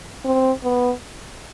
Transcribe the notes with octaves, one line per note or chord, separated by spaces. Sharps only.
C4
B3